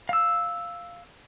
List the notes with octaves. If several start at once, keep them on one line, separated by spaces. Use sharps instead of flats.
F5 E6